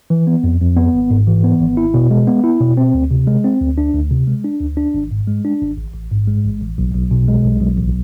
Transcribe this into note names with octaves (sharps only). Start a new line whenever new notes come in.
E3
B3
F2
F2
B3
G#1
G#2
E3
B3
G#1
E4
B2
G#3
B3
E4
B2
C4
D2
C3
G#3
C4
D2
D4
D2
C3
G#3
D4
D2
D4
G#1
G#2
G#3
D4
G#1
A1
A1
G#2
G#3
A1
A1
B1
B1
B2
G#3
B1
B1
A1